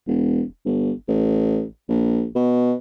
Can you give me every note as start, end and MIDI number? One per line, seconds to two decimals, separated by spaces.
0.07 0.43 28
0.65 0.91 31
1.08 1.64 33
1.89 2.26 34
2.35 2.74 47